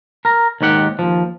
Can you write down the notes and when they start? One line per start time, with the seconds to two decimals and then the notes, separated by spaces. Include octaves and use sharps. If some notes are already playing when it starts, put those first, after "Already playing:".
0.25 A#4 A#5
0.61 D#2 G#2 D#3 G4 F#5
0.99 D#2 F3